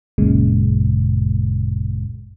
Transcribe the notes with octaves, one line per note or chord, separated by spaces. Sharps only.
G#1 C#2 F#2 A#2 C#3 G#3